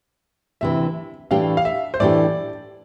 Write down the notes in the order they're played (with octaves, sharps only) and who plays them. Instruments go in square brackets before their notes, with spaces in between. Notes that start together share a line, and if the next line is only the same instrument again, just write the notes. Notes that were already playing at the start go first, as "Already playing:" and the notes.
[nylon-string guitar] D2 C3 E3 [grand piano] E5
[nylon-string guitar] A2 E3 A3 D4 G4 [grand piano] F5
[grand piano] F5
E5
C5
[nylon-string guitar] A2 E3 A3 D4 G4 [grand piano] D5